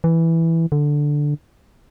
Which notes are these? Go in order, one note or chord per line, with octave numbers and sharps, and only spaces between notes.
E3
D3